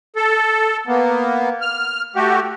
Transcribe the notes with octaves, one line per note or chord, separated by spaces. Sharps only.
A4
A#3 B3
F6
A3 F#4 G4